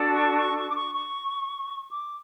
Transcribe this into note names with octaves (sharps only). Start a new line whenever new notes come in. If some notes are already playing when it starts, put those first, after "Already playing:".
Already playing: D4 F#4 A4
C#6
C#6
C#6
D6
C#6
C#6
D6